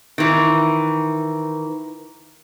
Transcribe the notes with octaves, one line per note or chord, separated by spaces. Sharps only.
D#3 E3